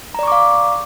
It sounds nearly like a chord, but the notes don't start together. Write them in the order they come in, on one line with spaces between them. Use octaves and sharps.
A#5 D5 C#6 D6 F5